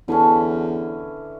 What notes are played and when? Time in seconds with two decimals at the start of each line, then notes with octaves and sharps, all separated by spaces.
0.08 E2 D3 E3 C#4